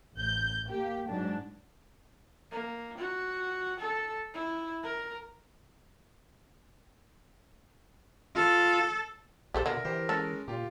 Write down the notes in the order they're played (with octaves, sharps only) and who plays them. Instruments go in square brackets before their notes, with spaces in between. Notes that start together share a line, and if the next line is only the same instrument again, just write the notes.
[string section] A1 G6
A#3 G4
G#2 F#3 D4
[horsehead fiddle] A#3
F#4
A4
E4
A#4
[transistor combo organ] F4 [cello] A4
[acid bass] A#1 [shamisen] G4 A4 C5
[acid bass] B2 [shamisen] D3 [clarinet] A#4 [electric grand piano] E5
[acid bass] E3 [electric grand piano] G4 C5
[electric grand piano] G#3 C#4 [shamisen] A4
[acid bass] A#2 [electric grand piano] F4 G4